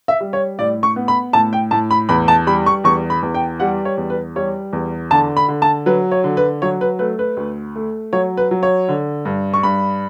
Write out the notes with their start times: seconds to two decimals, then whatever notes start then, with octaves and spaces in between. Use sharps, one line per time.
0.08 E5
0.21 G3
0.33 C#5
0.59 A2 D5
0.83 C#6
0.96 B3
1.08 B5
1.33 A2 A5
1.53 G5
1.71 A2 A5
1.91 B5
2.09 E2 B5
2.28 A5
2.47 G3 B5
2.66 C#6
2.84 E2 C#6
3.10 B5
3.23 E2
3.35 G5
3.60 G3 F#5
3.85 C#5
3.98 E2
4.10 B4
4.36 G3 C#5
4.73 E2
5.11 D3 A5
5.37 B5
5.48 D3
5.62 A5
5.86 F#3 B4
6.12 C#5
6.24 D3
6.37 B4
6.62 F#3 C#5
6.81 B4
6.99 A3 B4
7.19 B4
7.37 D2
7.76 A3
8.13 F#3 C#5
8.37 B4
8.51 F#3
8.63 C#5
8.89 D3
9.25 G2
9.54 C#6
9.63 G2 B5